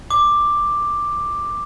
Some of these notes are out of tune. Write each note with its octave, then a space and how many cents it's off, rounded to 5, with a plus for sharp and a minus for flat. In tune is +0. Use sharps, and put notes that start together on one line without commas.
D6 +5